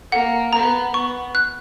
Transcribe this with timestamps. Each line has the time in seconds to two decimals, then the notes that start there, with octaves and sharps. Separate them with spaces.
0.12 A#3 F#5
0.53 B3 A#5
0.94 B3 C#6
1.35 F#6